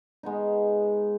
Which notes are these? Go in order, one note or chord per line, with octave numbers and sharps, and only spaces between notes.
G#3 B3 D#4